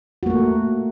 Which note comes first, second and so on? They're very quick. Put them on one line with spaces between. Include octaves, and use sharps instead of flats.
F#4 A#3 A3